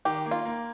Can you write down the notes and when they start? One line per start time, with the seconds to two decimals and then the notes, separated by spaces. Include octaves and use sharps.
0.05 D#3 G4
0.26 A#3
0.31 F4
0.45 A#3